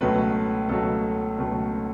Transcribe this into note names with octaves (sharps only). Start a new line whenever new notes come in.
C#2 B2 F#3 A3 B4
C#2 B2 F#3 A3 A4
C#2 B2 F#3 A3